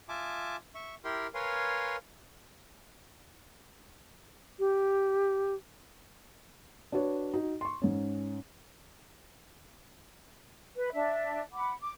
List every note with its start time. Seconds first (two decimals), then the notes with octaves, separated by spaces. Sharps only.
0.09 F4 E5 G#5 A5 D6
0.75 E5 C#6
1.04 E4 G4 A#4 G5 C6
1.34 A#4 B4 C#5 F5 G#5 C6
4.59 G4
6.92 D4 F#4 B4 C#5
7.34 D#4 F#4
7.61 C6 C#6
7.82 G#2 C#4
10.76 B4
10.93 D4 E5
11.53 F#5 B5 D6
11.80 D6